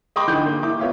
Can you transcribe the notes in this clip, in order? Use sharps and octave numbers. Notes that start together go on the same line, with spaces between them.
D#5 G5 B5 C6 D6
D3 E3 D#4 G6
A#3
E4 D6
B3 F4 C#5 E5 F5